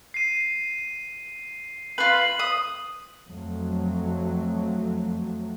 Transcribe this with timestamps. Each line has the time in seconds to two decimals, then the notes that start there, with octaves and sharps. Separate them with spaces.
0.14 C7 D#7
1.98 F4 B4 C7 F#7
2.39 D#6
3.27 F2 F#3 A3